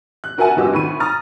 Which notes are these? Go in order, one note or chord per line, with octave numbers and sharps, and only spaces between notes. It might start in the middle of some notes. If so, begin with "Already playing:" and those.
F#6
F#4 A#4 E5 F#5 G#5 A5
F1 G2 F#4 G4 D#5 E6
D2 A2 D#3 B5 C#6 D#7
A#5 D#6 F6 A6